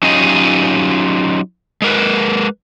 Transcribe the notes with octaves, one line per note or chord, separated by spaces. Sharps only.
F#3 C#4 D#4 F4 G4 D#5
G#3 A#4 B4